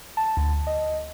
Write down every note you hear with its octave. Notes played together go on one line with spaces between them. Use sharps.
A5
D2
D#5